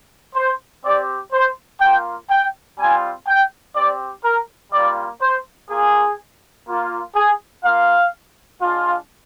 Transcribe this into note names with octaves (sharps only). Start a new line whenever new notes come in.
C5
C4 G4 D5
C5
A#3 F4 G5
G5
G3 C4 F4 G#5
G5
C4 G4 D5
A#4
G3 A#3 F4 D5
C5
A#3 F4 G#4
A#3 F4
G#4
A#3 F4 F5
G#3 D4 F4